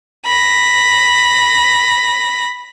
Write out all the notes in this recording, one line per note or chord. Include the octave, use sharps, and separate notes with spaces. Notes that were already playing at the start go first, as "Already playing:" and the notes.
B5 A#6